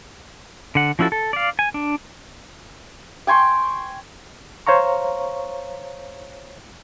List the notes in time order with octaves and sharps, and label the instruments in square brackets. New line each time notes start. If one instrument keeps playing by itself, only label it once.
[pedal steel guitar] D3 F#5
F3 C#4 E4 F#4 A4
A4
D5 F5
G#5
D4
[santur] G5 G#5 C6 C#6
[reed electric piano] C5 C#5 F5 A#5 C#6